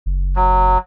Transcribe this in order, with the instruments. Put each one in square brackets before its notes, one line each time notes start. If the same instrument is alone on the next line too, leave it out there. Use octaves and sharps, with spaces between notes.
[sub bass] F#1
[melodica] F#3